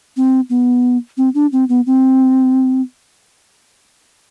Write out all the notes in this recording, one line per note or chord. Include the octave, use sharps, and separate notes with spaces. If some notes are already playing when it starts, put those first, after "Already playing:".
C4
B3
C4
D4
C4
B3
C4